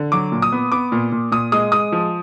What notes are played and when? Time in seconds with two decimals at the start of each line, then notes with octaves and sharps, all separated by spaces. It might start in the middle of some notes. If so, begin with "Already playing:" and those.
Already playing: D3
0.12 F#3 D6
0.32 A#2
0.42 D#6
0.52 B3
0.72 B3 D6
0.92 A#2
1.12 A#2
1.32 A#2 D#6
1.52 G#3 D#6
1.72 G#3 D#6
1.92 F3